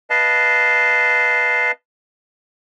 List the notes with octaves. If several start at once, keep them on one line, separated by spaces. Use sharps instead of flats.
B4 D#5 F5 A5